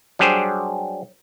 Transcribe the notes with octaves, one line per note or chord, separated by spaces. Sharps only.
F#3 G3 D4 G4 G#4 C5